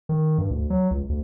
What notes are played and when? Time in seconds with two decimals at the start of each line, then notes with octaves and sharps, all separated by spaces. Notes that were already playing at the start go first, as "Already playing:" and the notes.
0.09 D#3
0.38 G2
0.51 D2
0.70 F#3
0.91 C#2
1.09 D2